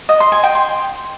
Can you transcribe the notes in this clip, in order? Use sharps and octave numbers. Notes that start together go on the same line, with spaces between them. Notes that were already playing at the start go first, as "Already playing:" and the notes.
D#5
C6
G#5
G5
C6